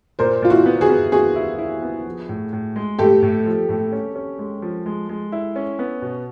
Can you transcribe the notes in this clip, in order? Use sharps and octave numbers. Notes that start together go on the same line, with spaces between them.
A#2 A#4 C5
A#2 F4
E4 F#4
B3
F#4 G#4
B3
B3 F#4 G#4
E4
E4
B3
F3
A2
A2
G#3
A2 G4 A4
A2
F3
A2
C#4
C#4
G#3
F3
G#3
G#3
E4
C#4
B3
B2